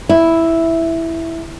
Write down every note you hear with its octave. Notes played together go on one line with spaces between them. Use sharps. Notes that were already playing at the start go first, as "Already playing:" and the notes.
E4